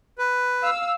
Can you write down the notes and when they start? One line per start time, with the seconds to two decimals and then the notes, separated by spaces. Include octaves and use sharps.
0.18 B4
0.63 F5 E6